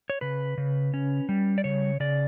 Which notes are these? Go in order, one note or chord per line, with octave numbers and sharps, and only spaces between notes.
C#5
C#3 B4
C#3
C#4
G3
D5
C#3 C#5
C#3 D5